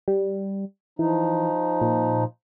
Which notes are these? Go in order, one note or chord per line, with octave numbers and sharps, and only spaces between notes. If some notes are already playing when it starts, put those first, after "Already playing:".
G3
E3 F3 D#4
A#2